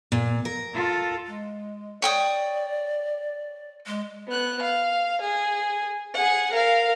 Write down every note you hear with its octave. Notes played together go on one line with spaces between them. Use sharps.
A#2
A#4
F4 A4
G#3
C#5 D5 G5 D#6
G#3
B3 F#6
F5
G#4
G#4 F#5
A#4 F5